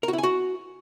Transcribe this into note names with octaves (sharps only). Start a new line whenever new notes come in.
A#4
F#4
E4
G#5
F#4